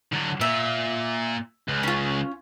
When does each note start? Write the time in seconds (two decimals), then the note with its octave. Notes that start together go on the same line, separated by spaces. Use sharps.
0.13 D3 F#3
0.41 A#2 E5
1.68 C#2
1.83 C#4 F4